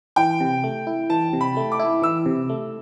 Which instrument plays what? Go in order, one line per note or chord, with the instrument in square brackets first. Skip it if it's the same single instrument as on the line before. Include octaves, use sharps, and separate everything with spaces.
[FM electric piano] E3 [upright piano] G5
[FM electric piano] C3
A3
E4
[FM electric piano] E3 [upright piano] A5
[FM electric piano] C3
[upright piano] B5
[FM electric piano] A3
[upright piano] D6
[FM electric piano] E4
[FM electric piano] E3 [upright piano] E6
[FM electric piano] C3
A3